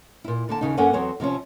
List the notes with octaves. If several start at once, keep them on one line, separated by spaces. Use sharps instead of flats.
A#2 E4
D3 A#3 A5
D#2 C#3 D#4
F#2 A#3 C#4 A4 F#5 G#5
E2 F#3 C4 C#5
C3 F3 C4 C#4